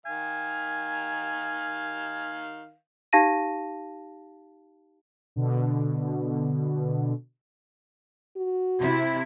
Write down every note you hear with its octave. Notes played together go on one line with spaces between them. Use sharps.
D#3 F5 G#5
D#4 G4 F5 A5 A#6 D#7
B2 D3
F#4
C3 E4